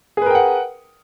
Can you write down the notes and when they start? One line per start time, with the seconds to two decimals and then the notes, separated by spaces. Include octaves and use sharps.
0.17 G#4
0.22 B4
0.26 A#4
0.30 G5
0.35 F#5